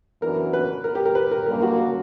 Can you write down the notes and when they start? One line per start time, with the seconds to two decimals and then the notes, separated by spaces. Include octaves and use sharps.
0.21 F#2 E3 B3 D4 F#4 A#4
0.53 B4
0.84 A#4
0.95 G4
1.05 A#4
1.15 B4
1.31 A#4
1.46 F#2 D3 G3 A#3 A#4
1.62 F#4